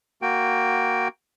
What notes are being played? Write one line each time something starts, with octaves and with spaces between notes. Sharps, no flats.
A#3 F#4 G5